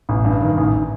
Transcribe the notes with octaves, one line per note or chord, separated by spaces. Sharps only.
A1
G2
D#3
A1